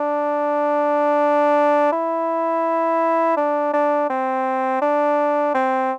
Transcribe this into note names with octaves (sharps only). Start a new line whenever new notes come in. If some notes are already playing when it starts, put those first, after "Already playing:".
Already playing: D4
E4
D4
D4
C4
D4
C4